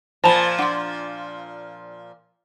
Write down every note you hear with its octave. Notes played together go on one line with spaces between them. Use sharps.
A#2 F3 C5 G#5 A5 B5
D4 F#5 C6 D6